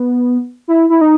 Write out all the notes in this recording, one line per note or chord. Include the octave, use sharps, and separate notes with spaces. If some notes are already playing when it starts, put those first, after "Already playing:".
Already playing: B3
E4
E4
D#4